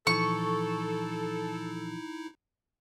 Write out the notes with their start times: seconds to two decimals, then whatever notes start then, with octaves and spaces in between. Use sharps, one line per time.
0.07 A#2 E3 F3 D#4 E4 A4 C#6